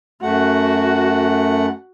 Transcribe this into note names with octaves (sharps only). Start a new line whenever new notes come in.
F#2 A3 F#4 F#5